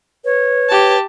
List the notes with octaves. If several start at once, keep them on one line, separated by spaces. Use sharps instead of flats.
B4 C#5
G4 A5